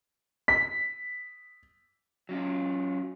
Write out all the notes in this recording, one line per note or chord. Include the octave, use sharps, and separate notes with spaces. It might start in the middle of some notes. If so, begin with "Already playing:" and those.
B6
F#3 C#4 F4